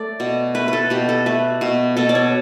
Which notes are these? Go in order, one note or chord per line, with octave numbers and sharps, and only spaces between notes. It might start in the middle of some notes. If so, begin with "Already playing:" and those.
Already playing: A3 D5
B2
A3 B4
A4 B4
B2 G4
A4
A3 B4
B2
B2 A4
D5
C#5